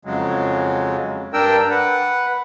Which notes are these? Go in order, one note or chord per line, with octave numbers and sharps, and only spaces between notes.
F2 C#3 F#3 G#3
G2 D4 A#4 G5 E6
B4 F#5